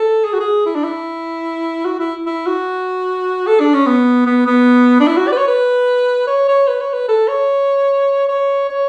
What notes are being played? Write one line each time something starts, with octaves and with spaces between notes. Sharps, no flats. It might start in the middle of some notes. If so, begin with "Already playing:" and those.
Already playing: A4
G#4
F#4
G#4
E4
D4
E4
F#4
E4
E4
F#4
A4
D4
C#4
B3
B3
B3
D4
E4
F#4
D5
B4
C#5
B4
C#5
C#5
B4
C#5
B4
A4
C#5
C#5
C#5